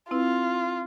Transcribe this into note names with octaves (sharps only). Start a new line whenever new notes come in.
C4 E4 F4 B4